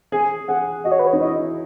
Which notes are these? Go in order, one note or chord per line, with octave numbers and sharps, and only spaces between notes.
G#4 G#5
G#4 F#5
F#4 D#5
C#5
B4
C#5
D#4
E4 D#5